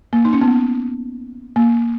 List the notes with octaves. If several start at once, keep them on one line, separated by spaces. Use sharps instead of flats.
A#3
D#4
C#4
B3
A#3